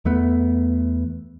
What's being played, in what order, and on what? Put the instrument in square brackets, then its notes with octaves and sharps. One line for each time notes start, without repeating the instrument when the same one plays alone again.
[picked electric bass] E2 A3 B3